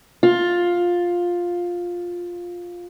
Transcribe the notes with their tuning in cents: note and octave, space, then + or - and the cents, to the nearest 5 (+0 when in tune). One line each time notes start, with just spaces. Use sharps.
F4 +10